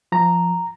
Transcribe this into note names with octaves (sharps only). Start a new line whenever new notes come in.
F3 A#5